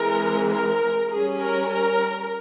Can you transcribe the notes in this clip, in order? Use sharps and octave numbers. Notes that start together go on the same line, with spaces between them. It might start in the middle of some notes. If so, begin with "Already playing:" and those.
Already playing: E3 G#3 C4 A#4
A#4
G3 C#4 G#4
A#4
A#4